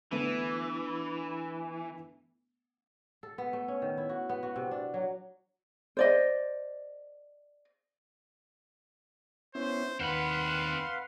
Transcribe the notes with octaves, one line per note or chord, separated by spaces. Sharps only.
D3 E3 A3 B3
A4
B3
A3
C#4
D#3
E4
F#4
B3
F#4
C3
D4
F#3
C5 D5 D#5
B3 C#4 E4 C5
D#2 C4 B4 F5 F#5 B5 C6